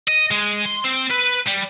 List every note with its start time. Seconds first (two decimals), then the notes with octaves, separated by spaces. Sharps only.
0.08 D#5
0.31 G#3
0.65 C6
0.84 C4
1.10 B4
1.47 G3